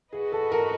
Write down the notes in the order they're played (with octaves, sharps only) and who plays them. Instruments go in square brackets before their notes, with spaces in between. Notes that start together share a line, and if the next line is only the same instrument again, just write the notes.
[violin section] F#4 B4 D#5 [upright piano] G#4
[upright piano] A4
A#4